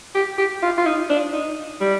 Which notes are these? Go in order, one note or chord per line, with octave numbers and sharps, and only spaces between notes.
G4
G4
F4
F4
D#4
D4
D#4
G3